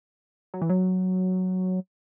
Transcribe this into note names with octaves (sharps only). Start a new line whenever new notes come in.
F#3
E3
F#3